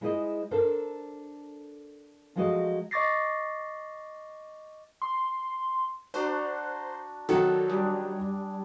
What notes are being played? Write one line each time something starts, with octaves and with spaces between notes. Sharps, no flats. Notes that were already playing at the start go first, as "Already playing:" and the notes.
G#3 E4 G#4 C5 D#5
D4 A4 A#4 C5
F3 F#3 G#3 A3 F#4 D#5
D#5 C#6 D6 A6 A#6 C7
C6
D4 F#4 C5 A#5
D#3 F#3 A4 F#5
G3 D4 G#4